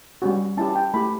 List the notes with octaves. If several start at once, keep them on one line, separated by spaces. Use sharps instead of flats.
G3 C#4 F#4
C#4 E4 G4 A5
G5
A3 E4 G4 B5